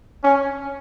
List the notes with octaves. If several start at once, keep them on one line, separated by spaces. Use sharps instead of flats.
C#4